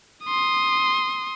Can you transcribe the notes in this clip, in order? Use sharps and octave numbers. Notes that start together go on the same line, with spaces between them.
C6 D#6